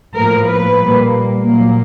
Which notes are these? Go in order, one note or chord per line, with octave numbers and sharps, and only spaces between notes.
A2 F3 A#3 A#4
B4
A#2 G3 A#3
A#2 F#3 A#3